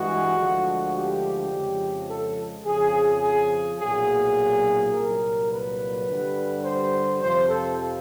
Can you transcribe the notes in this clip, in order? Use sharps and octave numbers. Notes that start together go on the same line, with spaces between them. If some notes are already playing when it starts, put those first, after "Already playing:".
Already playing: G2 E3 G#3 F#4
D2 D3 F3 G#3
G4
F2 C#3 F3 G#3
A4
F2 C#3 F3 G#4
G#4
B1 A#2 F#3 G#4
C2 A#2 F#3 A#4
B4
G2 D3 G3
C5
F2 C3 F3 C5
A4